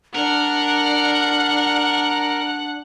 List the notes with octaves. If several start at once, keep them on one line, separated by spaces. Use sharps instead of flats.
D4 A#4 F#5